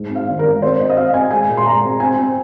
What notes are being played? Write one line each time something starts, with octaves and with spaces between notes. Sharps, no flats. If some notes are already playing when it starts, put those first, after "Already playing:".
Already playing: G#2
C4
F5
G#1
A#4
G#1
C4 C5
C4 D#5
D#5
C4 F5
C4 G#5
G#3 G#5
A#2
C6
G#3 A#5
C4
C4 G#5
C4